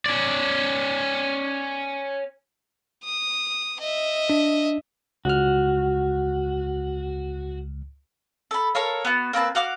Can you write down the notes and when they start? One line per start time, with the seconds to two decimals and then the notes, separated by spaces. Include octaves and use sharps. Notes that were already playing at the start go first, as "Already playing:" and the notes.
0.06 C#4 D5
3.04 D#6
3.80 D#5 E5
4.30 D4
5.25 C#2 F#4 F6
8.51 A4 B5
8.75 A4 A#4 C#5 F5
9.05 B3 F#4
9.33 A#3 C4 B4 A5
9.55 F#4 F5 D6 F6